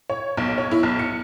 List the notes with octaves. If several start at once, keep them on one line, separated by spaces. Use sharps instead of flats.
C#5
B1
C#5
E4
B1
C#7